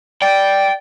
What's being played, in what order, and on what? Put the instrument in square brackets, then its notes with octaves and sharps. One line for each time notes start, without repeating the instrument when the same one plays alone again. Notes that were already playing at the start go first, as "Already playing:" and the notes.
[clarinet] D5 [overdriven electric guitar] G5